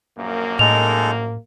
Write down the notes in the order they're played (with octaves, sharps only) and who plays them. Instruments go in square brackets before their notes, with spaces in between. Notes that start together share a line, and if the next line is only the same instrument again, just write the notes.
[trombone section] A#1 F#2 A#3
[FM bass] A2 [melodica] G#3 D#4 A4 [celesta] F7